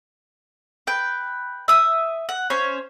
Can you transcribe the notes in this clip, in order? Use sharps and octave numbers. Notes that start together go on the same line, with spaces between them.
B4 G5
E5 D#6
F#5
C#4 C5 C#5